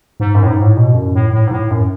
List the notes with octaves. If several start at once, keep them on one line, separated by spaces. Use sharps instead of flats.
G#2
F#2
A2
G#2
A2
B2
F#2
A2
A2
G#2
A2
F#2